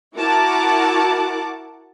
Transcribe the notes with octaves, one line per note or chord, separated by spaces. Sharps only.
E4 F#4 A#4 F#5 A5 D6